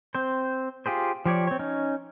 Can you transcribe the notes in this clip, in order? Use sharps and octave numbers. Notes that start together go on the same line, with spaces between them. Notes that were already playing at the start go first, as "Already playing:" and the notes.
C4 C5
F4 G4 G#4 C5
F3 G4 C#5 D5
C4 C#5
C#4 D#4